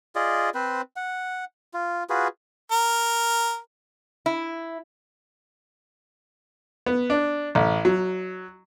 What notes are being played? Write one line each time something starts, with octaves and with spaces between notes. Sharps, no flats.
F4 G#4 D5 D#5
C4 B4 C5
F#5
F4
F4 F#4 G#4 B4
A#4
E4
B3
D4
A1
F#3